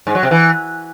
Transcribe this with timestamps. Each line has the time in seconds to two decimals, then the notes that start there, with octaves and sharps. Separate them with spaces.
0.07 G#2
0.15 F#3
0.23 C3
0.31 E3